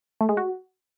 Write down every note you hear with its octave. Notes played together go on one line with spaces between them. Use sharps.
A3
G#3
F#4